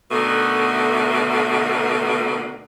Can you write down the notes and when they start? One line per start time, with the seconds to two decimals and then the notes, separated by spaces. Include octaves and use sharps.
0.11 B2 D3 D#3 A3 B3